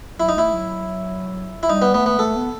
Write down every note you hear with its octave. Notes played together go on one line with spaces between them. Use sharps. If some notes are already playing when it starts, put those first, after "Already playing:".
F#3 E4
D#4
A3 E4
F#3
E4
G3 D#4
B3
A3 B3
B3
A3 A4
B3